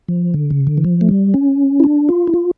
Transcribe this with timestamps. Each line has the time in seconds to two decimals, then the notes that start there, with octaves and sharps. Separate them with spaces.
0.08 F3
0.34 D3
0.50 C#3
0.67 D3
0.78 E3
0.84 F3
1.01 A3
1.09 G3
1.34 C#4
1.80 E4
1.84 D4
2.09 F4
2.27 E4
2.34 F4